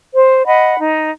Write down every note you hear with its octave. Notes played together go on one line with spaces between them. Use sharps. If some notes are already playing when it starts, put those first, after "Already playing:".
C5
D#5 F#5 B5
D#4